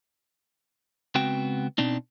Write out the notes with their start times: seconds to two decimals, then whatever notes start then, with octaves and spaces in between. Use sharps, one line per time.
1.15 C#2 B3 C4 F#4 G5
1.78 B2 C4 D4 D#4